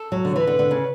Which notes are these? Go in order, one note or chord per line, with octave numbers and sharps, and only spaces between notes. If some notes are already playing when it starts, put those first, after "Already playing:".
Already playing: A4
F#3
D3
E3 B4
D3
D3
C#3